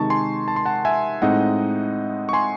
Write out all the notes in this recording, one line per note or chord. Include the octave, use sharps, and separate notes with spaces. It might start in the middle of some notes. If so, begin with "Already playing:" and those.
Already playing: C3 D#3 G#3 D#4 A5 C#6
G#5 C6
A5
C6
F#5 A5
E5 G#5
A2 G#3 C4 D#4 D#5 F#5
C#6
G#5 C6